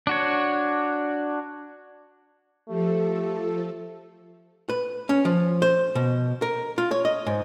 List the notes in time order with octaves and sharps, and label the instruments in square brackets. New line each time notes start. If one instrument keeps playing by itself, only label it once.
[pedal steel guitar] D4 F#4 C#5
[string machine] F3 A4 [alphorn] A3 [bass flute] G4
[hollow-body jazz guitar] B4
C#4
F3
C5
B2
A#4
F4
C#5
D#5
G#2